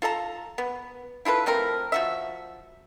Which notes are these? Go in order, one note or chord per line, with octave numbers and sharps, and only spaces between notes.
F4 A4 A5 A#5
B3
E4 F4 A4 B4
F3 A3 C4 A#4
F3 F#4 E5